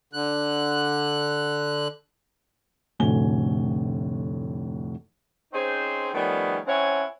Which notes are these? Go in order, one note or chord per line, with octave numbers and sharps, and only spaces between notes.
D3 F#6
F1 D2 A2 G#5 G7
C4 C#4 D#4 G#4 C5
D#3 F3 G3 A3 B3 C#4
C4 C#4 E4 C#5 F#5 G#5